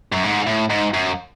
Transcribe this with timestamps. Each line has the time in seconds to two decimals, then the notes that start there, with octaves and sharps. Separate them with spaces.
0.12 F#2
0.24 G#2
0.47 A2
0.70 G#2
0.94 F#2